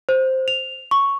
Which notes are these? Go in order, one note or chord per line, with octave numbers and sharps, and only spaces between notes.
C5
F7
C#6